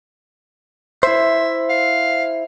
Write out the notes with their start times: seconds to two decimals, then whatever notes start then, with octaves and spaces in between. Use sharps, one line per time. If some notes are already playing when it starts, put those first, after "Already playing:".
1.03 E4 C5 E5
1.70 F5